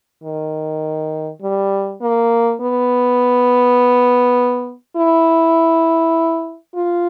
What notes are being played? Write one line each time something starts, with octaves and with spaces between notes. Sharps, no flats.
D#3
G3
A#3
B3
E4
F4